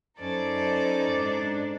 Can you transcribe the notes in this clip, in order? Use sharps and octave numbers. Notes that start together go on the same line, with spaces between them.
F#2 C#4 D#4 A4 C5 D5 A6
G#2 D4